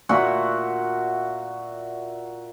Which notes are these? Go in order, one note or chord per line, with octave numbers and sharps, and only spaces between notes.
A#2 F#4 E5 F#5